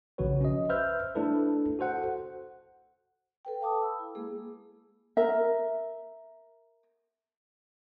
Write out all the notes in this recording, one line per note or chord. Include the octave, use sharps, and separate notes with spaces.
B1 C#3 F3 F#4 B4 C#5
C#4 D#5
B4 C5 E5 E6 F6 G6
A3 D4 E4 A4 B4
F#4 A4 C5 F#5
A4 B4 G5
F5 A5 D6 D#6
B5 E6
E4
G#3 A#3 G#4
A#4 E5